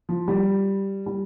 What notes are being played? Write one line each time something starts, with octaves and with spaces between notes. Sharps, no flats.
F3
G3
G3